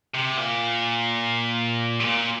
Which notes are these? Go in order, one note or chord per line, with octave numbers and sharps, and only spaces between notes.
C3
A#2
C3
A#2